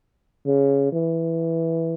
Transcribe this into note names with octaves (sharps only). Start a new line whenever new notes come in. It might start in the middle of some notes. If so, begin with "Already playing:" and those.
C#3
E3